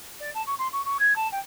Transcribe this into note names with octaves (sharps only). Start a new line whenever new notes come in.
D5
A5
C#6
C6
C#6
C#6
G#6
A5
G5